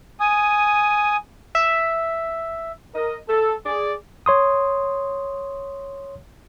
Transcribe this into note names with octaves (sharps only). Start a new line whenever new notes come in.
G#5 D#6
E5
A#4 D#5
A4
G#4 D5
C#5 C6 D#6